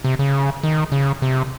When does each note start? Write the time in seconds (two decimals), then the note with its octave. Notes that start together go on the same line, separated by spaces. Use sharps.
0.04 C3
0.19 C#3
0.63 D#3
0.92 C#3
1.22 C3